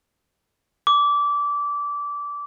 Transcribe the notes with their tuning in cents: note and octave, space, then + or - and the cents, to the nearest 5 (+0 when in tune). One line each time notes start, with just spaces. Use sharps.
D6 -20